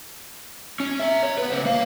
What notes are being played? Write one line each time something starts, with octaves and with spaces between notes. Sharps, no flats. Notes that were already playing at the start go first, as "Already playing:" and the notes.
C#4
G4 E5
C#5
B4 F#5
C#3 C5
A#3 F5